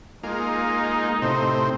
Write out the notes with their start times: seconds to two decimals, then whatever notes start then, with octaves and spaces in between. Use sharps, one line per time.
0.23 G#3 A#3 D#4 F4
1.22 A2 C3 C4